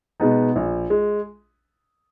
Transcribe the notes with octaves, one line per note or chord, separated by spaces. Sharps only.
B2 G#3 B3 D#4
A#1
G#3